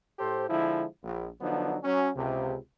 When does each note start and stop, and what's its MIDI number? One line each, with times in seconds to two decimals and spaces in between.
0.19 0.46 45
0.19 0.46 67
0.19 0.46 69
0.19 0.46 72
0.49 0.85 50
0.49 0.85 53
0.49 0.85 56
0.49 0.85 64
1.04 1.28 34
1.41 1.77 50
1.41 1.77 53
1.41 1.77 54
1.41 1.77 59
1.41 1.77 62
1.41 1.77 63
1.83 2.09 54
1.83 2.09 61
2.15 2.56 37
2.15 2.56 48